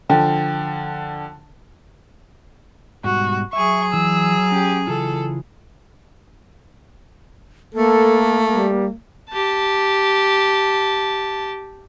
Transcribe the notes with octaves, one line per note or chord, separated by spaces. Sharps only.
D3 F3 G5
G#2 B2 G3 F#4
F#3 G#4 E5 C#6
E3 E6
C#4 G4
C#3 E3 F4 A4
A3 A#3 A4
G3
G4 A5